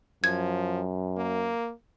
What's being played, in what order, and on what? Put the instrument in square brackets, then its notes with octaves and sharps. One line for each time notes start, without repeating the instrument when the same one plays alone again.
[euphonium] F#2 [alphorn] F3 [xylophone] G#6
[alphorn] A#3